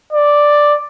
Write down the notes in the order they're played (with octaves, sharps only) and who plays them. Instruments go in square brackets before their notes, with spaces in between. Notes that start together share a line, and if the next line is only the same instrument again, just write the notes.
[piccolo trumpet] D5